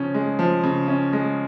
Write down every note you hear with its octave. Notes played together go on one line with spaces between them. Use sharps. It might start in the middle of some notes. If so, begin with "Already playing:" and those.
Already playing: C#3 F3 C#4
G#3
F3
C#3
C#4
G#3